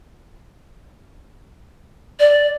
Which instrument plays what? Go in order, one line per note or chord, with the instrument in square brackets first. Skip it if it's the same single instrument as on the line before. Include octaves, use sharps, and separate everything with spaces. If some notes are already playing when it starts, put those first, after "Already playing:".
[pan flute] D5